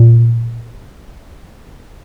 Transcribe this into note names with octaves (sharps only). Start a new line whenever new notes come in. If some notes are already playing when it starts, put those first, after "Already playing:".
Already playing: A#2